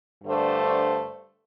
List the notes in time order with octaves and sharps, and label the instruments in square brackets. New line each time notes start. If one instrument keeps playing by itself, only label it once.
[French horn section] G2 D3 A3 D4 C5